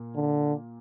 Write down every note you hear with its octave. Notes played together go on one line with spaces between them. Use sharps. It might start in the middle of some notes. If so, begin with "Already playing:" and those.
Already playing: A#2 A#3
D3